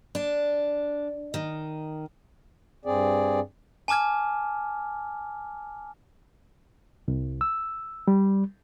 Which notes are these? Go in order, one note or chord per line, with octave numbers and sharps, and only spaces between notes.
D4
D#3
G2 C4 G#4 D5
G#5 A5 D6 F6 G#6
C2
E6
G3